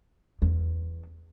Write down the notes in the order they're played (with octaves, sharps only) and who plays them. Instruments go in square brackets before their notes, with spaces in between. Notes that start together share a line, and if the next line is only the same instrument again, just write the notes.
[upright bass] E2